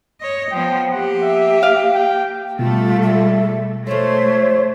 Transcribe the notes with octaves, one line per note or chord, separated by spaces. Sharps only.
C#5 D#5
F3 B3 G5
A#3 G4 F#5
E5
F5
G5
B2 G3 A3 F4 A4
E5
F3 G#3 A3 A4 C5 C#5